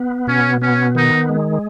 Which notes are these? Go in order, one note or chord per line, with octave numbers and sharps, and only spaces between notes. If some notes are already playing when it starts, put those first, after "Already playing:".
Already playing: B3
B2 C#4
B3 C#4
D#3 D#4
G#3